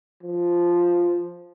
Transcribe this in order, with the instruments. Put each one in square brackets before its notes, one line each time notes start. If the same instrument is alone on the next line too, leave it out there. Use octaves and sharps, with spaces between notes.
[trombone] F3